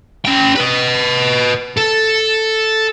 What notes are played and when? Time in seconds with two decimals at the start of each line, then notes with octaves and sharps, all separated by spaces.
0.25 C#4 G5
0.56 B4 D#5
1.77 A4